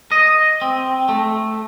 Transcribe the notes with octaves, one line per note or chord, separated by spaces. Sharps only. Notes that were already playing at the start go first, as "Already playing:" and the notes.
D#5
C4
A3